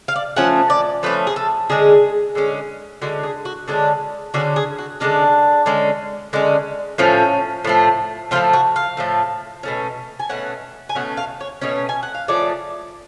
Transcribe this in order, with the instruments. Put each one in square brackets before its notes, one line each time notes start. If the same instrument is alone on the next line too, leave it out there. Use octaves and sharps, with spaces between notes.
[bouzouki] F5
D5
F3 A3 C#4 F#5
D5
F3 A3 C#4 B4
G#4
A4
D3 G#3 C#4 G#4
D3 G#3 C#4
D3 G#3 C#4 F#4
G#4
F#4
D3 G#3 C#4 D4
D3 G#3 C#4 F#4
G#4
F#4
D3 G#3 C#4 D4
D3 G#3 C#4
D3 G#3 C#4
A2 F3 A3 C#4
A2 F3 A3
A2 F3 A3 F4
F#4
F5
A2 F3 A3
B2 A3 C#4
G#5
B2 A3 C#4 F#5
G#5
B2 A3 C#4 F#5
F5
C#5
B2 A3 C#4 C#5
G#5
F#5
F5
F3 A3 C#4 D5